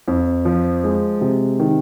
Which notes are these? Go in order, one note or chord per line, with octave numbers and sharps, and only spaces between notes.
F2
F3
G#3
C3
D#3